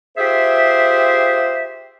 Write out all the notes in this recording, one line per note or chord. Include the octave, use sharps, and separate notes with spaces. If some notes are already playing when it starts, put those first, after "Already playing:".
F4 G4 G#4 C5 E5